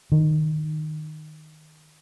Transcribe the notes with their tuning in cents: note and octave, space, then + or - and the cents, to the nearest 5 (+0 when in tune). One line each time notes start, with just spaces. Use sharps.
D#3 -10